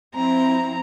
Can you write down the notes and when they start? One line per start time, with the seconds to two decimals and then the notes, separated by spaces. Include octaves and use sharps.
0.15 F3 C4 E4 A#5